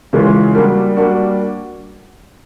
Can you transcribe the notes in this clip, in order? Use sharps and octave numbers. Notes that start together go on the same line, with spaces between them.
C#3 E3 G#3 C#4 F4
G3 A#3 D4 F#4
G3 A#3 D4 F#4